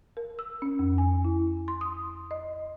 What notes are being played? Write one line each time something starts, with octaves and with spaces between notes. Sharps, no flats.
A#4
E6
C#4
F2
G#5
E4
C6
D#6
D#5